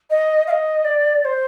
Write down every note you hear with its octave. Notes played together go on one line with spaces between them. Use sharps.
D#5
F5
D#5
D5
D5
C5